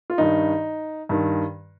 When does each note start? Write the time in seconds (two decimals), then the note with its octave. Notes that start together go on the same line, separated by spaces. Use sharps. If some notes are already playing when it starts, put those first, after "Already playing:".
0.10 F4
0.18 G2 D#3 D#4
1.09 G2 D#3